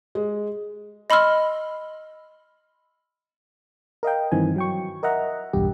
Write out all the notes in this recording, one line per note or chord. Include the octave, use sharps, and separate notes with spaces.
G#3
D#5 B5 C6 E6 F6
A#4 D#5 F5 G5
G2 D#3 E3 C4 G#5
F#3 G5 C#6
A#4 D#5 E5 F#5 A#5
B1 E2 G2 G4